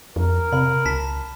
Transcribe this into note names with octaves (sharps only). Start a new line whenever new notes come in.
F2 A#4
C3 B5
C#2 A5 B6